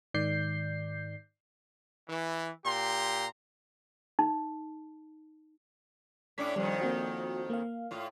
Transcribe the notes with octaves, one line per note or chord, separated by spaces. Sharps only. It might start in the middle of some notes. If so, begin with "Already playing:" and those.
G#2 D#3 D5 G6 C7
E3
A#2 G4 A#5 C6
D#4
A2 C#4 D4 D6 B6
F2 D#3 G3
A#3 C4 F#4
A#3 F5
A2 F4